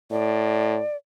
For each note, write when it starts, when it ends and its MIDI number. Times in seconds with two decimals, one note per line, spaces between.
0.11 0.79 45
0.11 0.96 74